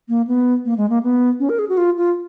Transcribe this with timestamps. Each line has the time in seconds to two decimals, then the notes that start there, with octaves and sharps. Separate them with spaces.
0.09 A#3
0.27 B3
0.65 A#3
0.77 G#3
0.90 A#3
1.03 B3
1.40 C#4
1.49 A#4
1.59 G#4
1.69 F#4
1.77 F4
1.97 F4